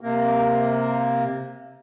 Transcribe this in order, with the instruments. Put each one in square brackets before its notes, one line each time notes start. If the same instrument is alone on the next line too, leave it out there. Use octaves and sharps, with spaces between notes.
[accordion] C3 A#3